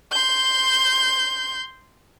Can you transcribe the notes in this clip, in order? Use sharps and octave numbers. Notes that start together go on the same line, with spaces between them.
C6 G6